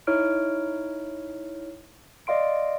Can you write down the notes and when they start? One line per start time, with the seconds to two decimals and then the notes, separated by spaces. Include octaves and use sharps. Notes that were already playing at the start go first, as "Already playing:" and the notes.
0.07 D#4 E4 C#5 F6 D7
2.27 D5 D#5 F5 C6 D7